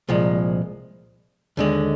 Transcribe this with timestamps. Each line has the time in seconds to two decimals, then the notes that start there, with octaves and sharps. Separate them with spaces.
0.08 C2 A#2 F3 G#3
1.57 D#2 D3 G#3